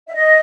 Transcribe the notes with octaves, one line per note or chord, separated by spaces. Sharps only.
E5
D#5